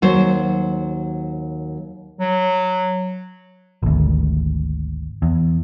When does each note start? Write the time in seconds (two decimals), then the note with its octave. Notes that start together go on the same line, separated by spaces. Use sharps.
0.02 D#2 F#3 C5
2.20 F#3
3.83 G#1 D2
5.22 E2